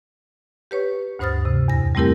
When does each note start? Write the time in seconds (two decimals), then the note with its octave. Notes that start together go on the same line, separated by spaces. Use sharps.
0.71 G4 B4 C#5 C#6
1.19 D2 G2 C5 D#6 F6 A6
1.45 C3
1.68 E2 A#6
1.95 G3 A3 C4 E4 G4 A#4